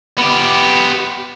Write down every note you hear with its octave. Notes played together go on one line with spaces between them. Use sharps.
B3 G4